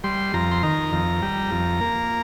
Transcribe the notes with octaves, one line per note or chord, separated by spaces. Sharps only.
G3 C6
F2 A#5
C6
D#3 A#5
F2
G3
F2
A#3